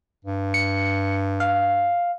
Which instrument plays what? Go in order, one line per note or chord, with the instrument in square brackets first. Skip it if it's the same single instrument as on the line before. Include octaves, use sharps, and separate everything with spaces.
[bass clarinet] G2
[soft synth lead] C#7
F5